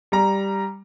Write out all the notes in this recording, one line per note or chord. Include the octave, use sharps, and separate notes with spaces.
G3 A#5